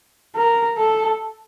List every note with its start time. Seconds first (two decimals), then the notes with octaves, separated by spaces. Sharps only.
0.35 A#4
0.77 A4